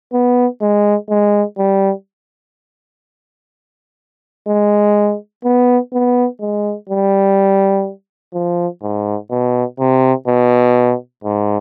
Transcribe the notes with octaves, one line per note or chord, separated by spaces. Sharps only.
B3
G#3
G#3
G3
G#3
B3
B3
G#3
G3
F3
G#2
B2
C3
B2
G#2